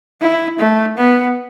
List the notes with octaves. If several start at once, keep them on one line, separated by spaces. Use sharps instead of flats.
E4
A3
B3